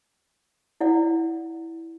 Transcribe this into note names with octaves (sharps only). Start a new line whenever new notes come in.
E4 D5 F#5